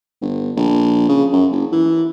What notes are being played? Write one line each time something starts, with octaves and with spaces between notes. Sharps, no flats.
G1
A#1
C#3
F#2
F#1
E3